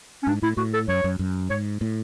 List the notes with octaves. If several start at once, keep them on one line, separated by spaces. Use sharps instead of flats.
C#4
G#2 D4
A2 E4
A2 F#4
A4
F#2 C#5
F#2
F#2
G#2 C#5
A2